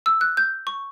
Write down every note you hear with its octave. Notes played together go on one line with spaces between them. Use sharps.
E6
F#6
G6
C#6